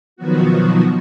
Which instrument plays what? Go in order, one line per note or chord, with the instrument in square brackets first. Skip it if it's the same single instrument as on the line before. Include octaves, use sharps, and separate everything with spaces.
[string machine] B2 D#3 F3 F#3 B3 F#4